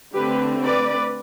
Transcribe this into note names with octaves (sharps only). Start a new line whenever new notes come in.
D3 A3 C4 G4 B4
B4 D5